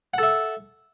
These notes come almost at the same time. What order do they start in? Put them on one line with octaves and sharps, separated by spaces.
F#5 A4 E5